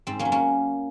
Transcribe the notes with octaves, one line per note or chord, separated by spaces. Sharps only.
G#2 C4
A#3 C#4
F#3
A#3 C#4